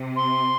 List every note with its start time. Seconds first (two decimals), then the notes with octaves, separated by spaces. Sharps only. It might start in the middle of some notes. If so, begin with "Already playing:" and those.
Already playing: C3
0.16 C6